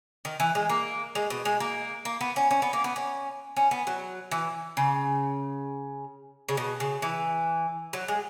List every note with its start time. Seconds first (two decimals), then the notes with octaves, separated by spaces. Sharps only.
0.25 D#3
0.40 E3
0.55 G#3
0.69 A#3
1.15 G#3
1.30 B2
1.45 G#3
1.60 A#3
2.05 A#3
2.21 B3
2.36 C#4
2.51 C#4
2.62 B3
2.73 A#3
2.84 B3
2.96 C#4
3.57 C#4
3.71 B3
3.87 F#3
4.31 E3
4.77 C#3
6.49 C#3
6.57 B2
6.80 C#3
7.02 E3
7.93 F#3
8.08 G#3